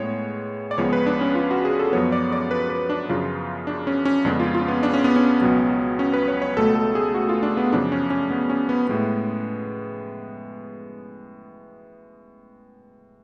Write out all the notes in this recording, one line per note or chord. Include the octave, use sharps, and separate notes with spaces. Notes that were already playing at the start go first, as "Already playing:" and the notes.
Already playing: A2 G#3 B3 C#5
D5
C#2 C#3 F3 G#3 B3 C#5
B4
D4
C#4
F4
F#4
G#4
A4
F#2 F3 B3 C#5
D5
D5
B4
B4
D4
F#2 C#3 F3 F4
D4
C#4
C#4
F2 C#3 G#3 B3 D4
F4
F4
C#4
B3
D4
C#4
B3
C#4
C#2 B2 F#3 B3
C#4
B4
C#5
C#5
C#2 B2 A3 A4
A4
G#4
F#4
F4
D4
B3
F#2 C#3 F3 D4
C#4
C#4
B3
C#4
B3
A2 G#3 B3